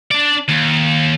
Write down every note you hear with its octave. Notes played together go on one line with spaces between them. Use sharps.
D4 D5
D#2